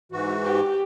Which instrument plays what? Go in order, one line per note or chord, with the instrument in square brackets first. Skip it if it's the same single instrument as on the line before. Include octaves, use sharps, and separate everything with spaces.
[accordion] G#2 E3 F#4
[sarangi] G4